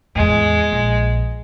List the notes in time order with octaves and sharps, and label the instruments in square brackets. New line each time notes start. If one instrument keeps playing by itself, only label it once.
[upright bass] E2 A2 [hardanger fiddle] G#3
[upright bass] A#1